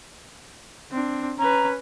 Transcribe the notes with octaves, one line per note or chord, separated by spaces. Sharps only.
C4 D4
C#4 B4 A#5